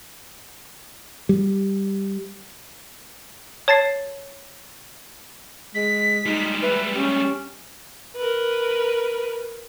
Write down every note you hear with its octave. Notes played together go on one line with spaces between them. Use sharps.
G3
C#5 A5 A6 C7
G#3 B6
G3 G#3 D#4
B4 E5
C#4 G4
A#4 B4